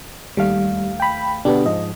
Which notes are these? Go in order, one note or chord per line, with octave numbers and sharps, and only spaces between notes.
D#2 G3 A3 F5
G5 B5
B2 D3 B3 D4 G4
G#2 F3 D#5